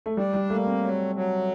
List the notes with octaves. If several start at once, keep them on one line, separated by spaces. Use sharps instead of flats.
A3
G3 D4
G3
A3 A#3
C4
F#3
F#3